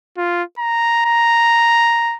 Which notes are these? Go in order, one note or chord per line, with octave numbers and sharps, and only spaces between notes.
F4
A#5
A#5